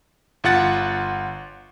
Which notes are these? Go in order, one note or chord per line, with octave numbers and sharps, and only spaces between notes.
G1 F4 F#5 A6